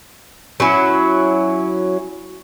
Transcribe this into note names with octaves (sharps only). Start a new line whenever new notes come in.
F#3 C#4 E4